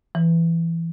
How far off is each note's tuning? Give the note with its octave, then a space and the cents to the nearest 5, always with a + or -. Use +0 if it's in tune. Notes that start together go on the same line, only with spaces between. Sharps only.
E3 +15